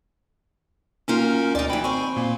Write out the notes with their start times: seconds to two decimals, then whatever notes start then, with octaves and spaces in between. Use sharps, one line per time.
1.08 D2 A#3 C#4 D#4 F4 A#4
1.55 D2 D#4 D5
1.70 F#2 E3 G5 B5
1.84 C4 C5 G#5 B5 C#6
2.16 A#2 A#3